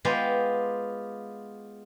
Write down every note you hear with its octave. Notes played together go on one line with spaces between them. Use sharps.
G#3 B3 F4 G4